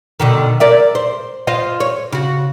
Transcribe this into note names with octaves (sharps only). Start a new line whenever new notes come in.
B2 D3 D#3
A#4 D5 E5
C5
F4 C5 D#5
C#5
C#3 F#4